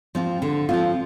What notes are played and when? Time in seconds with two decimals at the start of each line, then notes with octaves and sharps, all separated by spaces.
0.15 F3 C4 F4
0.42 D3
0.69 F3 C4 F4